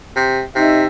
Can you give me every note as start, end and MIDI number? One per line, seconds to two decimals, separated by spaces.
0.16 0.42 48
0.55 0.86 48
0.55 0.87 63
0.55 0.87 76